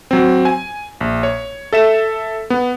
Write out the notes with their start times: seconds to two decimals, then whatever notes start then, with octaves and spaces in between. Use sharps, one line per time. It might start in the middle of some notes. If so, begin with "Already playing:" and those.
0.11 F#3 C4
0.45 G#5
1.01 A#1
1.23 C#5
1.73 A4 E5 E7
2.50 B3